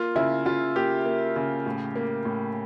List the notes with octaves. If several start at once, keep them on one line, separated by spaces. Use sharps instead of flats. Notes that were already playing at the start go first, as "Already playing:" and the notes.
Already playing: A#3 F4
C#3 E4
C#3 F4
A#3 G4
A#3
C#3
A2
A#3
A2